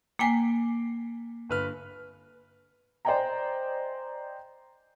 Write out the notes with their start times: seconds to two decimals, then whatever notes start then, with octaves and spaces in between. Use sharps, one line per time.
0.19 A#3 G5 G#5 D6 B6 C7
1.49 G1 B4 F6
3.05 C5 D5 D#5 G5 G#5 A#5